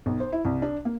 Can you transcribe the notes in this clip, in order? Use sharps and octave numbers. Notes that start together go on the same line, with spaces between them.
B1
C5
E4
C2
D4
A#3